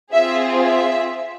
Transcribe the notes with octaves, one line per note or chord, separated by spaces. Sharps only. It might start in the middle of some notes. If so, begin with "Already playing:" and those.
C4 F4 G#4 E5
E5